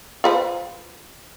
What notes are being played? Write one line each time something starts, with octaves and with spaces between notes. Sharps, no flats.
F4 B4 C5